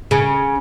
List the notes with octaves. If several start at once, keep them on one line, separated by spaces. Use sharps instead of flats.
C#3